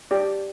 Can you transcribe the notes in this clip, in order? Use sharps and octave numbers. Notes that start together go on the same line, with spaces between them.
G4 D5